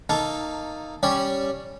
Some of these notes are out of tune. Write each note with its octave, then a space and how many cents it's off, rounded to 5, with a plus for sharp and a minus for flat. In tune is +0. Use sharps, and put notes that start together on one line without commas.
A#3 -15 D#4 +0 A4 -10
G3 -5 C#4 -5 D5 +0